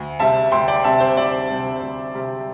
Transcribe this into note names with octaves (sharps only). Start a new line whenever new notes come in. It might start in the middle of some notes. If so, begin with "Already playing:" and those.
Already playing: D2
C3 G3 C4 E5 A5
D2 G5 C6
D5 G5
C3 G3 C4 E5 A5
C5
D2 D5
C3 G3 C4
D2
C3 G3 C4